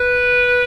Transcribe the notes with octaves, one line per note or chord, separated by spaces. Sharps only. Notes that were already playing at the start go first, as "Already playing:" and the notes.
Already playing: B4